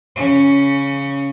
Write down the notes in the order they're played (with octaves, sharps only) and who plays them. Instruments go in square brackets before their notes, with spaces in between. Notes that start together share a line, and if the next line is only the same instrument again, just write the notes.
[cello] C#3 C#4